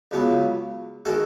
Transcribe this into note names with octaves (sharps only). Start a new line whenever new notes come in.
C#2 C#3 F#3 B3
D#3 G#3 F#4 A4